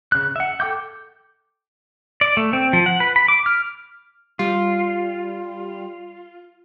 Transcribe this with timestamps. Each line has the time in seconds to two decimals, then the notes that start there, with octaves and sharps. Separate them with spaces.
0.12 C#3 F#6
0.36 E5 F#5
0.60 A4 G5 D6 G6
2.21 D5
2.37 A3
2.53 C4
2.73 F3
2.86 F#5
3.00 B4
3.16 B5
3.28 D6
3.46 F6
4.39 G3 F4